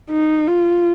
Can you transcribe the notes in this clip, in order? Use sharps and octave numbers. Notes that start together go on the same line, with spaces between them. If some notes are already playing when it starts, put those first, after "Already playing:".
D#4
F4